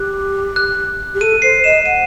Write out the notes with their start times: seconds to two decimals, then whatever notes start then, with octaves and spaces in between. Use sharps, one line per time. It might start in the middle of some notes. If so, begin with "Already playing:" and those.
Already playing: G4 F#6
0.56 F#6
1.14 G4
1.21 A4 D#7
1.42 C5 C7
1.64 D#5 E7
1.86 F#5 D#7